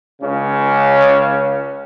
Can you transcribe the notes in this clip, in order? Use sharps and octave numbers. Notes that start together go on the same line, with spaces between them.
C#2 C#3 C#4